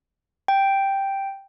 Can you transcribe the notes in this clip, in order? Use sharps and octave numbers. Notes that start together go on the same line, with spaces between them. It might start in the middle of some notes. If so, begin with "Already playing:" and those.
G5